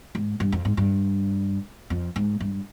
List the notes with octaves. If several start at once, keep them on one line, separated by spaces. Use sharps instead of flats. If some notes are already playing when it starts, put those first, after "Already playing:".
G#2
G2
F2
G#2
G2
F2
G#2
G2